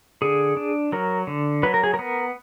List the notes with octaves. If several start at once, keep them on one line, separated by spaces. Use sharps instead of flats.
D3 G#4
D4
F#3 A#4
D3
F#3 B4
A#4
G#4
A#4
B3